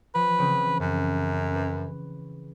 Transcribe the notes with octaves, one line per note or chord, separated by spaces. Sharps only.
F3 B4
C#3 E3 C4
F#2
B4